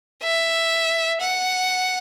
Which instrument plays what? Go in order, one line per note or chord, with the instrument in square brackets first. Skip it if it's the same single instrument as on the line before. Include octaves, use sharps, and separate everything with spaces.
[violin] E5
F#5